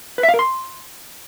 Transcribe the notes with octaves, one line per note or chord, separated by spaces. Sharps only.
B4
E5
F5
A#4
C6